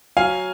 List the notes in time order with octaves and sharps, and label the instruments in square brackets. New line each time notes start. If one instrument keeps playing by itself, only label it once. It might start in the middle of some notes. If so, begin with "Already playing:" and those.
[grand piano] F#3 F5 G#5